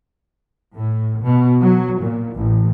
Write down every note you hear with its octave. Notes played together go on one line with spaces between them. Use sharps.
A2
B2
F#3
A#2
A1